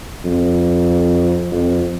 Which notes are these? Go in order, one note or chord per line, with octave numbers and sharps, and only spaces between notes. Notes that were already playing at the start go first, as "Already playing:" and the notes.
F2
F2